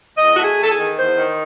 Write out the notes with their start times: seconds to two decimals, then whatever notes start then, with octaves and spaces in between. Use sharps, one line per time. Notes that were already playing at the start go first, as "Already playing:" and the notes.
0.16 E2 D#5
0.35 A3 F#4
0.43 G#4
0.57 E2
0.63 A4
0.70 G#4
0.77 D#3
0.97 E2 C5
1.18 D#3